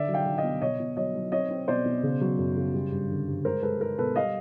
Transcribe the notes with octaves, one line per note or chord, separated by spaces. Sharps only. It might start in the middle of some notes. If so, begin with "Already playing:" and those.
Already playing: D3 D5 E5
F#3
F5 G5
F#3
D#5 F5
B3
B2 C#5 D#5
B2
F#3 C#5 D#5
F#3
C4 C#5 D#5
C4
B2 C5 D5
B2
C#3
F#3
F#2
C#3
G3
G2
D3
G2
G#3 A#4 C5
G#3 A4 B4
G#3 A#4
B2 A4 B4
G3 D#5 F5